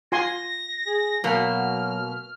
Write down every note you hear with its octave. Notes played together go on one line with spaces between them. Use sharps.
F4 G#5 C6 A#6
G#4
B2 F#3 A#3 F6